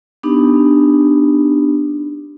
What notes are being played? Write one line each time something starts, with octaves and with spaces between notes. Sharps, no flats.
B3 D4 D#4 G4